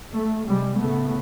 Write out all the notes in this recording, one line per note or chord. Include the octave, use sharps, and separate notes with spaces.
A3
C3 G3 G#3
A2 C#3 A3 B3